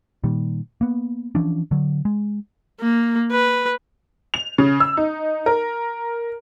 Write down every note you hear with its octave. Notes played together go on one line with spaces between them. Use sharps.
A#2 D#3 G3
A#3 B3
E3 F3 C#4 D4
D3 F#3
G#3
A#3
B4
F7
C#3
E6
D#4
A#4